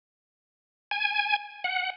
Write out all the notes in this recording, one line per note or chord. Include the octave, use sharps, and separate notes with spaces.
G#5
F#5